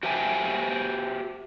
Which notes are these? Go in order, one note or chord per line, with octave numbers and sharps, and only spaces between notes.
F#4 G4 C5 E5 G5 G#5